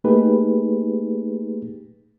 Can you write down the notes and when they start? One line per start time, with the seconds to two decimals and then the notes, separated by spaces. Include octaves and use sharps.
0.04 A3 A#3 D#4 G4 G#4 B4